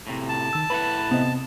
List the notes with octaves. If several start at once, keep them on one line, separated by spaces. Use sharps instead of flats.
A2 C3
A5
D#3 E6
A2 E4 B4 F#5 B5
C3 B3 C4 D#5